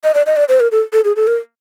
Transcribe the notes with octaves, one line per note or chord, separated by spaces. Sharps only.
D#5
D5
D#5
D5
C5
A#4
A4
A4
G#4
A4
A#4